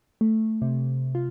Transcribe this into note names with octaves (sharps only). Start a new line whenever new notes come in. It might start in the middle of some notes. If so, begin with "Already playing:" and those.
A3
C3
F4